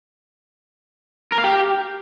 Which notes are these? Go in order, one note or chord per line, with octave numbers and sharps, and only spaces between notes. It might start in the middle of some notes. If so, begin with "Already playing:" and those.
A#4
F5
G4